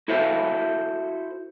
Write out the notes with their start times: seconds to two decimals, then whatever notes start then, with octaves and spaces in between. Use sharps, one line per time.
0.08 E4 F#4 A4 C5 E5